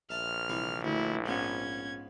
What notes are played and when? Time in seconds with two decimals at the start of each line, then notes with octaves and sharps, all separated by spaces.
0.11 A#1 E5 A5 F6
0.49 C2 E3 C4
0.84 D2 E4
1.26 G#2 F3 B3 C#4 G#6